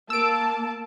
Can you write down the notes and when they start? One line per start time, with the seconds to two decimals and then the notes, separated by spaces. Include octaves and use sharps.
0.10 A#3 A5 E6 D7